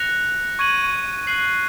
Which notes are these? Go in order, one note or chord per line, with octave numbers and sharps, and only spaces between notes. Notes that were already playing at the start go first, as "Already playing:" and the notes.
Already playing: F#6 A#6 C#7 F7
C#6 G#6 D#7 F#7
F#6 C7 F#7